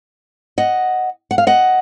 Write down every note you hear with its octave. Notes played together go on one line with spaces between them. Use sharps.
D#5 F#5
F#5
F5
D#5 F#5